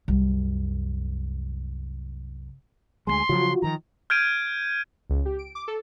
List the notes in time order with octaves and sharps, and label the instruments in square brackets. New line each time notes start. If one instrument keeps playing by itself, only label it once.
[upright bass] C2 F#2
[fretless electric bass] D2 G3 G#3 [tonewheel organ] G#5 [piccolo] C6
[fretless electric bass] C#3 F3 F#3 [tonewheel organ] F4 F#4
[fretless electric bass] D#3 F3 [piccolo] A#5
[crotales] F6 G6 G#6 D7 D#7
[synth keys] C#2
G4
D7
D6
A4